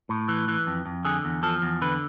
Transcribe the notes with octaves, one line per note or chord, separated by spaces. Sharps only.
A2
E3
E3
F2
F2
D3 G#4
E2
F3 A4
E2
D3 B4